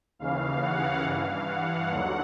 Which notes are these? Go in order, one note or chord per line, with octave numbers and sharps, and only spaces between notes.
D#2 C#3 E3 F5
F#5
G2 E3 F5
F#5
D#2 D3 F#3